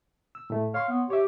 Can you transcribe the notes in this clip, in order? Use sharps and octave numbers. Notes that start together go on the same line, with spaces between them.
E6
A2 A3
C#5 F5 C6 C#6
B3
G4 C#5 E5